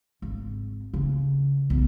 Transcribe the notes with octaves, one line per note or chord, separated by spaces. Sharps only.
G#1
C#3
B1 G#2